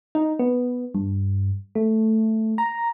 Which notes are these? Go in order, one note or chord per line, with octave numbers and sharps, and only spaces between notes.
D#4
B3
G2
A3
A#5